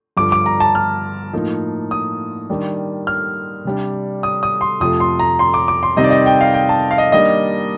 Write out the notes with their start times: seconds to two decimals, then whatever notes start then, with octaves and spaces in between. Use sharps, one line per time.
0.17 G2 D3 F3 D6
0.32 D6
0.46 A#5
0.60 A5
0.75 F6
1.33 A2 F3 A#3 D#4
1.91 D#6
2.49 D#3 G3 D4
3.07 F6
3.65 C3 G3 D4
4.23 D#6
4.43 D#6
4.61 C6
4.80 F2 C3 F3 A3 D#6
5.00 C6
5.19 A#5
5.39 C6
5.54 D6
5.68 D6
5.83 C6
5.96 C3 D#3 G3 C4 D#4 D#5
6.04 D5
6.11 D#5
6.26 G5
6.41 F5
6.54 G5
6.69 A5
6.91 F5
6.98 D#5
7.12 D#3 G3 A#3 D4 D#5